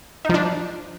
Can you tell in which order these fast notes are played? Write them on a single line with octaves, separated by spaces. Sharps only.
D#4 F3 D4